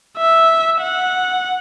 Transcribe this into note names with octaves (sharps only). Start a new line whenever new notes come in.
E5
F#5